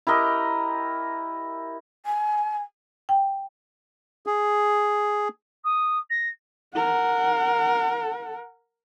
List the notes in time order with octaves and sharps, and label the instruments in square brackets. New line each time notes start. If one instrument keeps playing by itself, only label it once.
[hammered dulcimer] E4 G4 A#4 D#5
[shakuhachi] G#5
[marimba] G5
[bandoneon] G#4
[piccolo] D#6
A#6
[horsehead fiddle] A#4 F#5